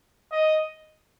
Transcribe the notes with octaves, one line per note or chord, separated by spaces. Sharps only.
D#5